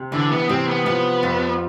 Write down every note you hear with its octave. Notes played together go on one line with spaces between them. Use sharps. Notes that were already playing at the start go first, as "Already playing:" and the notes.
Already playing: C3
D3 E3
B3
C3 C4
B3
F3 B3
F2